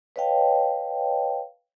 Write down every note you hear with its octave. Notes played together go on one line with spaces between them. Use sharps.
B4 C#5 D#5 F5 G5 A5